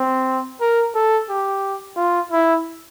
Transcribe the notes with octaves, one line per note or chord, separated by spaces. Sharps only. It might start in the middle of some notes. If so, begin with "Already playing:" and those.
Already playing: C4
A#4
A4
G4
F4
E4